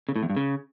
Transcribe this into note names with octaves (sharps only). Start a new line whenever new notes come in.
C#3
A2
E2
G2
C#3